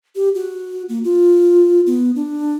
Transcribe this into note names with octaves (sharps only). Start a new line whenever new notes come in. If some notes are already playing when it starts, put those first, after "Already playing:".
G4
F#4
A#3
F4
B3
D4